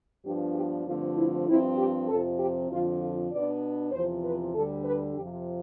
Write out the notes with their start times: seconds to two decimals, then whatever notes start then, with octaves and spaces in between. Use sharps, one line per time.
0.24 G2 F3 B3 D4 G4
0.55 G4
0.86 G2 D3 F3 A3 C4 F4
1.17 E4
1.48 G2 F3 C4 E4
1.78 G4
2.09 F2 C3 F3 C4 A4
2.39 G4
2.70 F2 D3 F3 F4
3.01 F4
3.31 B2 B3 D4 D5
3.92 E2 C3 F3 C5
4.24 B4
4.54 D2 D3 G3 D4 A4
4.85 B4
5.15 F2 C3 F3 G4